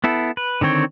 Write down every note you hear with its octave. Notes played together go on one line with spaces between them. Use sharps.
B3 E4 A4
B4
D3 D#3 C4 C#5 G5